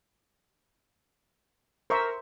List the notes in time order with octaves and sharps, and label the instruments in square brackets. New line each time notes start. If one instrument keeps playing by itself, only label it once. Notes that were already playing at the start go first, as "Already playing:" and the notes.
[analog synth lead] A#4 [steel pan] C5 E5 [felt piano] C6 C#6